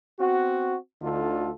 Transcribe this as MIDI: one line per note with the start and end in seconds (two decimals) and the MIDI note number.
0.19 0.74 59
0.19 0.74 60
0.19 0.74 66
1.02 1.51 38
1.02 1.51 50
1.02 1.51 63
1.02 1.51 65
1.02 1.51 69